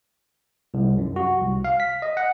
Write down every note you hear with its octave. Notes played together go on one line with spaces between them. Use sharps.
C2
F#2
F#4
C2
F5
B6
D#5
F#5